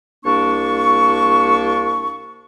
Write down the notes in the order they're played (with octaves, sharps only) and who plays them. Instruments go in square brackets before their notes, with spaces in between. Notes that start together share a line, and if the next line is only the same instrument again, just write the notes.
[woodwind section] C2 A#3 D4 C#6